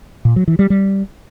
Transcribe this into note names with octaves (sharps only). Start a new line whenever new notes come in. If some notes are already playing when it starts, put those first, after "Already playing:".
A#2
F#3
E3
G3
G3